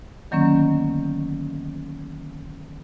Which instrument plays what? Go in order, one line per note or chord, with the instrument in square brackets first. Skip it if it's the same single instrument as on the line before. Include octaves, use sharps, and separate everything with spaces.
[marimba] D3 D#3 F#3 A#3 B3 C#4